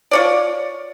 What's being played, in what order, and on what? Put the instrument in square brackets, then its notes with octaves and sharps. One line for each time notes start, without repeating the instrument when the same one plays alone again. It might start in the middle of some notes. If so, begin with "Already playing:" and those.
[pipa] F4 C#5 D5